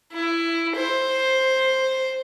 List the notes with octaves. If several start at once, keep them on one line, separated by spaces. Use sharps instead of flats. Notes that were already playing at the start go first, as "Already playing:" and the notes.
E4
C5